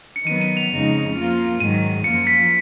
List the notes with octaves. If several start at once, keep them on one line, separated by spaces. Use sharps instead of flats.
C#7
D#3 F#3 B3 D#7
D#7
F7
F2 C#3 G#3 D#4
F3 A#3 F4
G#2 D#3 F#3 D#7
F#2 F3 A#3 F4 C#7
B6